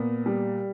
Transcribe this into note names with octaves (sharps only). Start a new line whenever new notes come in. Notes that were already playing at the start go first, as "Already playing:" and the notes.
Already playing: A#2 B3
G3